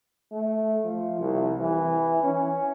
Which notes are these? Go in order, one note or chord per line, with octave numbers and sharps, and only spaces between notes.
A3
F3
C2
E3
C#4